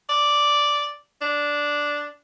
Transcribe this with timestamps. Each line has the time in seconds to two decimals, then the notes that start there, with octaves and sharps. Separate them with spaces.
0.09 D5
1.21 D4